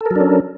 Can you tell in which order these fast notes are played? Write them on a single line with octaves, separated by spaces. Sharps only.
A4 A#4 F#3 D4 C#4